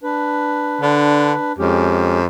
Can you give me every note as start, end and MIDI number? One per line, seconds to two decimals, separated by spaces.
0.03 1.52 62
0.03 1.52 71
0.82 1.34 50
1.58 2.27 41
1.58 2.19 56
1.58 2.19 61
1.58 2.19 67